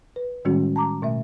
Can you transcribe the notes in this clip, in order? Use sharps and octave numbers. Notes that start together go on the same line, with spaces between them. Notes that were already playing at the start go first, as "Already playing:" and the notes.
B4
A2 D#3 G3 G#3 C#4 F#4
A5 A#5 D6
B2 A3 E5